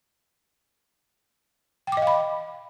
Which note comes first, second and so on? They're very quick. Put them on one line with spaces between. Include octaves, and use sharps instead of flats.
G5 D6 D#5 F5 B5